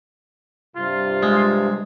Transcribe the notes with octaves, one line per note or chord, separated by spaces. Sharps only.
G2 C3 F4
G#3